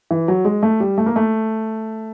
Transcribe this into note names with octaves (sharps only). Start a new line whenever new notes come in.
E3
F#3
G#3
A3
G3
A3
A#3
A3